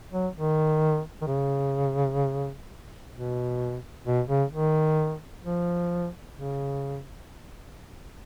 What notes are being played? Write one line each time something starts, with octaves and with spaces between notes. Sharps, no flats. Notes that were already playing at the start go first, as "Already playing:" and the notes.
F#3
D#3
D#3
C#3
B2
B2
C#3
D#3
F3
C#3